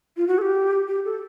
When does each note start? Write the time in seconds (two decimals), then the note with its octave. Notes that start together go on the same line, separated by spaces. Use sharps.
0.17 F4
0.27 F#4
0.38 A4
0.42 G4
0.88 G4
1.05 A4